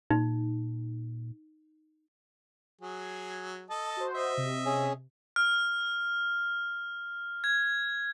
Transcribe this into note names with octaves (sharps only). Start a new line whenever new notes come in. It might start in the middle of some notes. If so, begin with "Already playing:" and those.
A#2 D#4
F#3 G#4
A4 D#5 A5
F#4 C5
D#5 E5
C3
C#4 G#4
F6
G#6